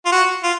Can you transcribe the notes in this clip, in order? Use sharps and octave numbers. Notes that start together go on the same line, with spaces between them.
F4
F#4
F4